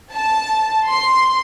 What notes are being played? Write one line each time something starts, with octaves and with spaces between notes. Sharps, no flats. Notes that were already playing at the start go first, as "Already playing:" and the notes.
A5
C6